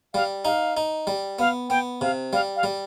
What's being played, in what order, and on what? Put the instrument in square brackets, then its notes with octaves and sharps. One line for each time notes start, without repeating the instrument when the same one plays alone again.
[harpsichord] G3 [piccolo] F5
[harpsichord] D#4 [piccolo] F5
[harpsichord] D#4
G3
[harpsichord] B3 [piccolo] F5
[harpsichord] B3 [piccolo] G5
[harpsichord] C3 [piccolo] F5
[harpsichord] G3 [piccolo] F5
[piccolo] F5
[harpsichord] G3